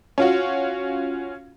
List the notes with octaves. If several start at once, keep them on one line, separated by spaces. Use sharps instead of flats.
C#4 F4 F#4